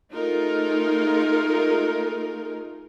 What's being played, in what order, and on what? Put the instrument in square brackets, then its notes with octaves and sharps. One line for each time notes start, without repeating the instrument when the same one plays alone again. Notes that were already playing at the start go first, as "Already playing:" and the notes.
[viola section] A3 D#4 F4 G#4 A#4